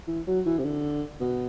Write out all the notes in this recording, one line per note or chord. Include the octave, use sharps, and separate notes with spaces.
E3
F#3
E3
C3
D3
B2